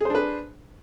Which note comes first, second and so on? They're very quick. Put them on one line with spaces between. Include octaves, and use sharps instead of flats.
G#4 C5 D4 B4